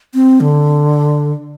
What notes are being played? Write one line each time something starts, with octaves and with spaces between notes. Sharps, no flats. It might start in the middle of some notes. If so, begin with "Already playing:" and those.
C4
D3